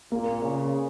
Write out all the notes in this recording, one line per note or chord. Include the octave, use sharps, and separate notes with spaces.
A#2 A#3
C#3